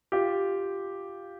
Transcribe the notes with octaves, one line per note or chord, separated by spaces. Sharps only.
F4 G4